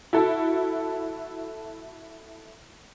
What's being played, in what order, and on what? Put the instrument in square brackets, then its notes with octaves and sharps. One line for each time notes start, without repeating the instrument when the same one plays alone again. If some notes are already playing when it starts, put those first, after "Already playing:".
[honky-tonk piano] E4 F#4 A4